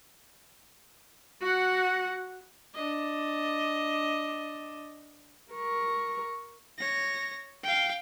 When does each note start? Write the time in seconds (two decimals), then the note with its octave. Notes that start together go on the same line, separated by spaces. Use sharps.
1.41 F#4 F#5
2.74 D4 D#5
5.53 A#4 C#6
6.78 C#5 A#6
7.64 F5 G5